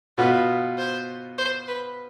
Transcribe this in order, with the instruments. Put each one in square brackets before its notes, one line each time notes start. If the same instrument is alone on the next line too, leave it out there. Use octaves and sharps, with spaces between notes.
[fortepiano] B2 B3 F4 [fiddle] B4
[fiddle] C5
C5
B4